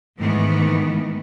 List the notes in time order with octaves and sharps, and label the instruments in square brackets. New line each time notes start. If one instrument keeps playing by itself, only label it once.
[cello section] G#2 D#3 E3 A3 B3